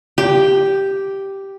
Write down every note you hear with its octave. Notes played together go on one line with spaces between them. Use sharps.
G4